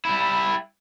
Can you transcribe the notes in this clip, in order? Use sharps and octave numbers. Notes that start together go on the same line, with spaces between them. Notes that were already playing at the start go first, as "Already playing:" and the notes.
G3 E4